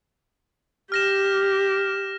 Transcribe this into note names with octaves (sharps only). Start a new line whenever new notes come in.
G4 F6 A#6 E7